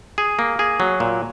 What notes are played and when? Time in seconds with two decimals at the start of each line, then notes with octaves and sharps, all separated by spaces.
0.18 G#4
0.39 A#3
0.59 G#4
0.80 F#3
1.00 A#2